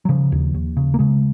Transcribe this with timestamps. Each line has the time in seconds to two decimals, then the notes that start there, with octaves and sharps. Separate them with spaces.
0.05 F#3
0.09 C#3 F3
0.32 D#2
0.54 D#2
0.77 C#3
0.94 A#3
0.99 C#3 G#3